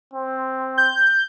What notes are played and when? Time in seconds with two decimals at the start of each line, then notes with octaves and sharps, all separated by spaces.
0.13 C4
0.78 G6